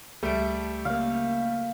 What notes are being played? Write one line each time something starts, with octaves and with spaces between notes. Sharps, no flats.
C#2 G3 A3 A5 D7
C#3 A#3 F5